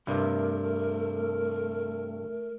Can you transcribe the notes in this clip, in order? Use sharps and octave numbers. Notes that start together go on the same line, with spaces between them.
G2 C3 A3 A#4